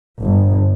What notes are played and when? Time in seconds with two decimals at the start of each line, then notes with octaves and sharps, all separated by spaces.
0.21 G1